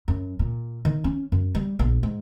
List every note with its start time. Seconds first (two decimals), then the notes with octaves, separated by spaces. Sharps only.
0.08 F#2
0.39 A#2
0.85 D#3
1.04 C#4
1.32 F#2
1.55 G3
1.79 A#1
2.03 G#2